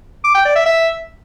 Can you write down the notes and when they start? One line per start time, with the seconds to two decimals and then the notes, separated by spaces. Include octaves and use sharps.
0.24 D6
0.35 G5
0.45 D5
0.56 E5
0.66 E5